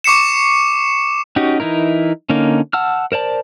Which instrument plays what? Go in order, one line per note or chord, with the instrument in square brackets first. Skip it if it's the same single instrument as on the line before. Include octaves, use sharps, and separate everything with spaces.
[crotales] C#6 D6 C7 C#7 E7
[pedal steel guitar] C#4 D#4 F#4 G4
E3 D#4 E4 A#4
D3 A#3 C#4 D#4
F#5 A5 E6 F6
A#4 C5 D5 A5